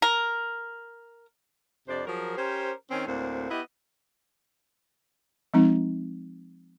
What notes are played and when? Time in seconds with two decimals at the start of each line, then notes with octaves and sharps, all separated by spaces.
0.02 A#4
1.88 F2 C3 D4 C5 D5
2.06 F3 F#3 G#4 A#4
2.38 C#4 G4 A#4 C5
2.91 D#3 C4 C#4
3.07 D2 A2 A#3 C4
3.50 B3 E4 G4 D#5
5.54 F3 G#3 C4 D#4